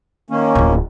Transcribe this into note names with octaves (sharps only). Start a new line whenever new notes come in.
D#3 A#3 C#4
D1 F4